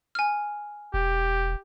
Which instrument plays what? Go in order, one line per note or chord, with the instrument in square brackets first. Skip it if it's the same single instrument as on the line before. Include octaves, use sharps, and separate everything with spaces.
[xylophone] G#5 F6
[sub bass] E1 [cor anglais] G4